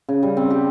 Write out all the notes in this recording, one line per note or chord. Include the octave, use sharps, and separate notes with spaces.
C#3
G3
C4
G4